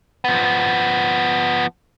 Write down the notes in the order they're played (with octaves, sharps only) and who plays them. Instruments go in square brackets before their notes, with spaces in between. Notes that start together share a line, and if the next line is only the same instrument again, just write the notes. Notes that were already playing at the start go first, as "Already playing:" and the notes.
[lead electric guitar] F3 B3